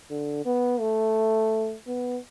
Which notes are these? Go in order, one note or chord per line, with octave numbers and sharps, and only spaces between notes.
D3
B3
A3
B3